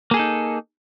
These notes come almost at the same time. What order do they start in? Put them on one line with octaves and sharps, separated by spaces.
A#3 G#4 A4 D#4